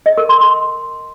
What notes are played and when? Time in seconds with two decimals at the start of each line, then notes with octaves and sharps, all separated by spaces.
0.06 D#5
0.18 A#4
0.29 C6
0.41 C6